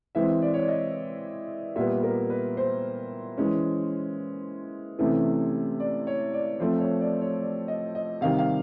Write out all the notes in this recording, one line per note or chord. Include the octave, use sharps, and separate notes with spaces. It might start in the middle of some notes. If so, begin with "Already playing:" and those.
E3 G#3 C4 E5
D5
C#5
D5
D#5
A#2 G3 B3 E5
A#4
B4
C5
E3 G#3 C#4
C3 E3 A3 C#4
D5
C#5
D5
F3 A3 C4 C5
C#5
D5
C#5
D5
D#5
D#5
C3 D#3 G3 F5
F5